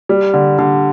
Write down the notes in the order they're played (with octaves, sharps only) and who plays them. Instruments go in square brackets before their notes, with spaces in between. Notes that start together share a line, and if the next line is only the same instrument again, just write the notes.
[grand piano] G3
D3
D3